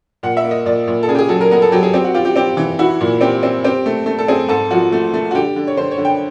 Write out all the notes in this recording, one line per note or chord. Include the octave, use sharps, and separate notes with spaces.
A#2 F#5
E5
A#3
D#5
A#2 D5
A#2
A4
C#3 G#4
G4
G#4
F#3 A4
A#4
B3 A#4
A4
F#3 G4
G#4
C4 G4
F#4
F4 G4
G4
C4 G4
E3
E4 F#4
A#2
C4 G4
C4
C4 G4
A3
A3
A4
C4 G#4
G#2 A4
F3 F#4
A3
A3
F#4
D3 G4
D3
C#5
D3 C5
C#5
D3
G5